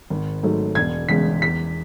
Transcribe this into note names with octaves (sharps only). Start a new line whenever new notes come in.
G#1
G#2 F#3 A3
E1 G#6
E2 C#3 G#3 B6
E2 B6